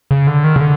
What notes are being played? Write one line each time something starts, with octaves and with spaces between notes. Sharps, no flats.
C#3
D3
D#3
C#3
D3